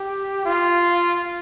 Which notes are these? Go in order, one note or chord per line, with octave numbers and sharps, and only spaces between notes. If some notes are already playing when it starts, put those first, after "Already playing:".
Already playing: G4
F4